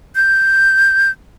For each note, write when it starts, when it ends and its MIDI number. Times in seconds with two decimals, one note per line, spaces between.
0.16 1.11 91